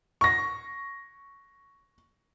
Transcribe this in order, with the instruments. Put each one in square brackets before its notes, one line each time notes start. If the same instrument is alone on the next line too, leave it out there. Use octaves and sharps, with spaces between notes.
[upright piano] C#6 A#6